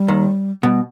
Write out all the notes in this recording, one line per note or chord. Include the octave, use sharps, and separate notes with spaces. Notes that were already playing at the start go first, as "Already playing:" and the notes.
Already playing: G3
D#2 D#3
B2 G3